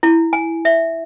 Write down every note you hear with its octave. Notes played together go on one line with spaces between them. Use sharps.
E4
G#5
E5